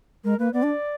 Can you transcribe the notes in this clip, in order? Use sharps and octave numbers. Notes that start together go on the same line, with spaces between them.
G#3 A#4
A#3 B4
B3 D5
D4